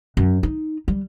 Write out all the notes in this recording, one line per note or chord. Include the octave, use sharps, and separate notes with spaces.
F#2
D#4
G3